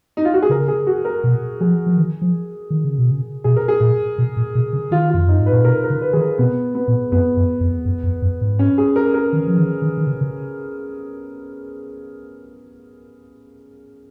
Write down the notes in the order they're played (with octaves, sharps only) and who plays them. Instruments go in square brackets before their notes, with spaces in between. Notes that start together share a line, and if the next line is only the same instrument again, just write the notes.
[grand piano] D#4
F4
F#4
G#4
[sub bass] C#3 [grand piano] A#4
[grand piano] G#4
F#4
A#4
[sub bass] B2
[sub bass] F3 [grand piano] G#4
[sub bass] F3
D#3
F3
D#3
C#3
B2
C#3
[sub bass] B2 [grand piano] G#4
[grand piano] A#4
G#4
[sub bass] A#2
B2
A#2
B2
C#3
[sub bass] D#3 [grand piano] F4
[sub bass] F2 [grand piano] F4
[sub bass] F#2 [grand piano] D#4
[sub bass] G#2
[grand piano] B4
[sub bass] A#2
[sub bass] B2 [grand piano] A#4
[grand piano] A#4
[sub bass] C#3
[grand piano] B4
[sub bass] D#3 [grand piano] G#4
[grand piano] A#4
[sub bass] B2 [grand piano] B3
[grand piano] B3
[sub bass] A#2
[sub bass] F#2 [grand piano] B3
[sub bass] F#2
F2
F#2
F2
F#2
G#2
[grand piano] C#4
G#4
A#4
A#4
[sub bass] D#3
F3
D#3
D#3
D#3
C#3
C#3